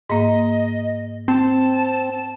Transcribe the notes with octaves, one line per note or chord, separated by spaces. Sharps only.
G#2 A#3 D#5
C4 A5